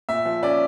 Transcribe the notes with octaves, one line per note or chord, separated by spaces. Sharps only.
A#2 E5
F3
C#4 D5